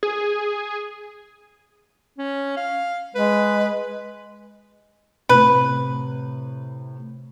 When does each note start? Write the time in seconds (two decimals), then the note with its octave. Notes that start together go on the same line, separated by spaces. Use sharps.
0.03 G#4
2.18 C#4
2.57 F5
3.15 G#3 B4
5.29 A2 C3 B4